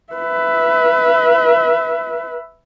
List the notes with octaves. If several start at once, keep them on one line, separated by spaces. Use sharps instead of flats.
B4 E5